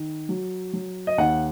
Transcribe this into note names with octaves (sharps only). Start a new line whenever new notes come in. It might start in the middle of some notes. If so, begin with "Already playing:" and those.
Already playing: D#3
F#3
F#3
D#5
D#2 F#5